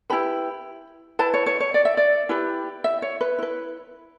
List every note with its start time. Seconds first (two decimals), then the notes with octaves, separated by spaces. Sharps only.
0.10 E4 G4 B4 B5
1.19 E4 B4 A5
1.34 C#5
1.46 C#5
1.60 C#5
1.74 D5
1.85 E5
1.97 D5
2.29 E4 G4 B4
2.84 E5
3.02 C#5
3.21 B4
3.38 E4 B4